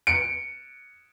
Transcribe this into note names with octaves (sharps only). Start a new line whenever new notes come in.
C#7 D7